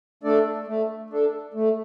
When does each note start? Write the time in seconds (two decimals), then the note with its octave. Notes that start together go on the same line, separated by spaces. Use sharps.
0.23 A3 D4 A4 D5
0.67 A3
1.10 D4 A4
1.54 A3